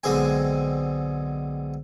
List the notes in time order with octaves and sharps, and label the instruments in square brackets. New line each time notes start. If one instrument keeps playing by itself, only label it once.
[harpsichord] B1 D3 G#3 C4 G#4 G#5